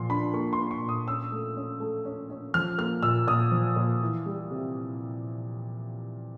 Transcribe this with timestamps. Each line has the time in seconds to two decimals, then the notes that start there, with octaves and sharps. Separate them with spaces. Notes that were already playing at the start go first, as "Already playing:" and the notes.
Already playing: A#2 F3 C6
0.09 D4 B5
0.34 A#3 C#6
0.53 C6
0.58 A#3
0.71 C#6
0.82 A#2
0.89 D#6
1.07 C#4 E6
1.32 A3
1.56 C#4
1.80 A3
2.05 C#4
2.30 C#4
2.54 F3 F6
2.78 A#3 F6
3.03 A#2 E6
3.27 A#2 D#6
3.51 F3
3.76 A#2
4.01 E3
4.26 G3
4.51 C3